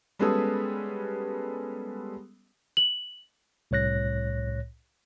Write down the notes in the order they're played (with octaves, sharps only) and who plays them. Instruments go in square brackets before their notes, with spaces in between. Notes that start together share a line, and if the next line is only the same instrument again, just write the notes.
[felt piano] G3 G#3 B3 C#4 G#4 A4
[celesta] F#7
[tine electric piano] C2 A2 C#5 F#6 A#6